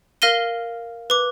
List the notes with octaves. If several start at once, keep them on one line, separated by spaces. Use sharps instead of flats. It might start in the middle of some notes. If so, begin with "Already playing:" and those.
A#4 F5 F6 A#6 D#7 G7
B4 D6